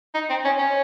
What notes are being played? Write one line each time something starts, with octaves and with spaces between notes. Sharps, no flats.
D#4
C4
C#4
C#4